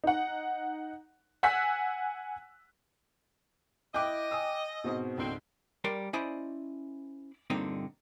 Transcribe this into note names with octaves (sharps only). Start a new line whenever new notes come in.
D#4 F#5
F#5 G#5 E6 F#6 B6
E4 D#5 G5 D6 F#6 G6
G#5 D#6 E6
G#2 B2 C4 D#4
C#2 G#2 D3 C4
G3 A#4 D5 C6
C#4 E4 C5 D5 D#5 B5
G2 A#2 D3 C4 D#4